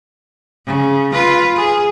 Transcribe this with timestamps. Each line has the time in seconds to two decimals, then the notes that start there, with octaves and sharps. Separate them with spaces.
0.66 C#3
1.12 F4 B4
1.56 G#4